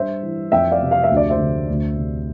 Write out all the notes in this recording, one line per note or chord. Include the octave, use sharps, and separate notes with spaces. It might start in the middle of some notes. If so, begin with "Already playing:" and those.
Already playing: G2 C5 E5
E3
F2 E5 G5
D5 F5
C3
F5
E5
D2
D5
C5 E5
D3
D2
C3